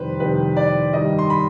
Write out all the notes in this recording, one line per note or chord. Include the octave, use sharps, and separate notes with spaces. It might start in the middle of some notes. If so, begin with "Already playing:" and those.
Already playing: F2 C3 D#3 G3 B4 C5
F2 C3 D#3 G3 B4
D5
G2 D#3 G3 D#5
C6
B5